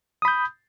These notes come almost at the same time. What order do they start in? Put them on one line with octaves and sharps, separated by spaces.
D#6 B5 G6